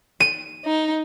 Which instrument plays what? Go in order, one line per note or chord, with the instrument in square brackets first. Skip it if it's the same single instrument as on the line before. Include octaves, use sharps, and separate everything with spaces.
[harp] D#7
[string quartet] D#4